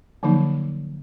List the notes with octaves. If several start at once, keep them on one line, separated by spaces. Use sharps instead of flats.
D3 F3 F#3 A#3 D#4